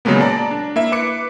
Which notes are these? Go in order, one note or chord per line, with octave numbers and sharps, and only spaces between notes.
A#2 C#3 F#3 G#3 A#3 B3
D5 A5 A#5
D4
A#3 E4 E5
B4 D6 C#7